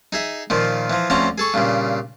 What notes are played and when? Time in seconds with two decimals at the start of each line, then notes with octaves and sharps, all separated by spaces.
0.13 D#4 G#4 E5
0.50 A#2 D#3 F3
0.90 E3 F3
1.10 D2 F3 C4 C#4 A#5
1.38 G#4 A4 C#6
1.54 G2 A#2 C#3